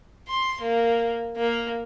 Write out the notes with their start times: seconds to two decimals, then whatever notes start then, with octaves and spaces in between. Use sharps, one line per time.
0.28 C6
0.61 A#3
1.37 A#3